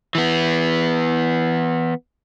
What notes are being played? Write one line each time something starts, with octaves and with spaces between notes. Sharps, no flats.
E3 B3